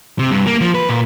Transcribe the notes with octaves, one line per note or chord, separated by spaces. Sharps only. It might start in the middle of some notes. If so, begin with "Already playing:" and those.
C3
G2
A#3
F3
B4
A#2